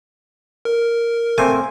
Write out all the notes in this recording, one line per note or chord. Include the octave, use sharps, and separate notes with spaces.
A#4
A3 A#3 C4 G#5